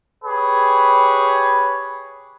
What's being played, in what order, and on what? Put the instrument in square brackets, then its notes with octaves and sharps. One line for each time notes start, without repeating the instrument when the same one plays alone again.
[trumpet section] G4 G#4 B4 C#5